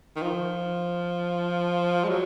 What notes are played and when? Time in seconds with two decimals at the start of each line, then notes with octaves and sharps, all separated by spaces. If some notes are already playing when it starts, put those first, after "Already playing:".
0.16 D#3
0.22 F3
2.04 G#3
2.09 F#3